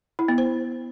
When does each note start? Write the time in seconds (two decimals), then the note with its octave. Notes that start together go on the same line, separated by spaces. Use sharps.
0.19 E4
0.28 B3
0.38 C5